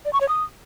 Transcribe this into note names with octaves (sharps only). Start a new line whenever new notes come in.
D5
C#6
C#5
D#6